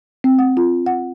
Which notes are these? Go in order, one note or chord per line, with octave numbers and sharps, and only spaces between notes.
C4
F#5
F4
F#5